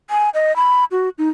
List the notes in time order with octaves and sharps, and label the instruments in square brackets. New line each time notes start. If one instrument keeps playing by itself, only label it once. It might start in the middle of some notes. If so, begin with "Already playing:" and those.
[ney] G#5
D#5
B5
F#4
D#4